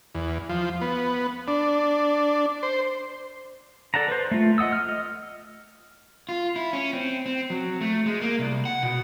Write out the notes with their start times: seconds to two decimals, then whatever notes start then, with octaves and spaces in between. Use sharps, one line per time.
0.15 E2
0.49 F3
0.81 B3
1.48 D4
2.63 C5
3.94 A4 D5 F#5 A5 A#5
4.08 B4 C5
4.31 A3 F4
4.58 D#5 F#5 D#6 E6
4.73 F6
4.89 D#5
6.29 F4
6.56 E4
6.73 C#4
6.93 C4
7.26 C4
7.50 F#3
7.81 A3
8.06 G#3
8.21 A#3
8.39 C2
8.65 F#5
8.83 B2